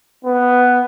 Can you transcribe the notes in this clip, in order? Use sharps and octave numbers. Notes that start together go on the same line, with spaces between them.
B3